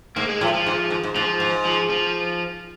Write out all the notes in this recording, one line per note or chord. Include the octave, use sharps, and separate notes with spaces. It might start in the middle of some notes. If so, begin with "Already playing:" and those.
G#2 A#3
G#3
A2 F3
F3
G#2
G#2
G#2
G#2 F3
G#2
F3
F3